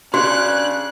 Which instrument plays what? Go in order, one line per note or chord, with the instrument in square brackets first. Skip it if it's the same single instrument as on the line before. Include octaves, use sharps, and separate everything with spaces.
[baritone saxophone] C#3 [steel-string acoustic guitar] D4 [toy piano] F#4 [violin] F#6